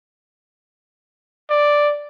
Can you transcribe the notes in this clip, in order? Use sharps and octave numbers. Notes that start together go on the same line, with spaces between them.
D5